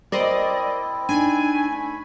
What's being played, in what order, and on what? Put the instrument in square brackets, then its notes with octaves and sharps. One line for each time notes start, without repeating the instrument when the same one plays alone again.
[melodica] C4 E4 [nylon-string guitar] A#4 C5 [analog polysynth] D5 D#5
[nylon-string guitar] D4 D#4 [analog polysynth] G#5
[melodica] A3 B5